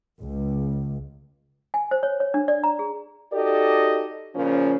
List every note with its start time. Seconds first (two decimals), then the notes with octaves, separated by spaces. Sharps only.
0.20 C#2
1.74 G#5
1.91 C5
2.03 C#5
2.20 C#5
2.34 D4
2.48 D5
2.64 A#5
2.79 G#4
3.33 D#4 F#4 G4 A4 D5 D#5
4.35 A#2 C#3 F3 C#4